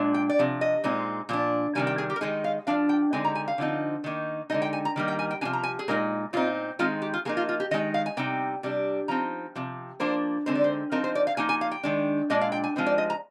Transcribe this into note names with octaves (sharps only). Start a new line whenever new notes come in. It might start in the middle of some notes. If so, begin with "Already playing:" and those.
Already playing: A#2 G#3 D4
G5
D5
C3 F3
D#5
A#2 G#3 C4 D#4
A#2 F3 D4
C3 D#3 G3 G#5
G5
G#4
G4
A#4
D#3 G#3 D#4 G#4
F5
F3 G#3 D4 F5
G5
D3 G#3 C4 D#4 G#5
A#5
G#5
F5
D3 F3 C4 D#4
D#3 A#3 D#4
D3 G#3 D#4 D#5
G5
G#5
A#5
D#3 G3 A#3 D#4
G5
G#5
G5
C3 F3 A#3 D4 G#5
A#5
G#5
G#4
A#2 G#3 D#4 A#4
A#2 G3 C4 D#4 F4
D#3 G#3 C4 D#4 F4
G4
F4
F3 A#3 D#4 G#4
F4
F4
G4
D#3 G#3 D#4 D#5
F5
G#5
C3 G3 C4 D#4 G5
C3 G3 D4
F3 C4 D#4 A#5
C3 F3
F3 A#3 D4 C5
D3 G#3 C4 D#4 C5
D5
C5
F3 C4 D#4 A#4
C5
D5
F5
F3 A#3 D#4 G#5
G#5
F5
G5
D#3 G#3 D4
A#2 G#3 D4 D#5
F5
G5
G#5
F3 G#3 C4 D#4
D5
D#5
A#5